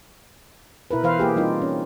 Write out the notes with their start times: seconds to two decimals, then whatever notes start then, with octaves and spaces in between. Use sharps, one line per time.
0.91 B2 E4 A#4 B4
1.03 E3 B4 C5 F5
1.19 A#3 G4 G#4
1.36 G3 C4 D#4 F4 A#4
1.62 C#4